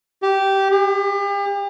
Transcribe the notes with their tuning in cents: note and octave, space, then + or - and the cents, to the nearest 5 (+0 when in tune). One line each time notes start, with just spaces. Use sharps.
G4 -15
G4 +40